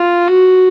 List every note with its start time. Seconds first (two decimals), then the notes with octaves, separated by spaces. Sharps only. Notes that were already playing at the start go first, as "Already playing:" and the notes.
Already playing: F4
0.28 F#4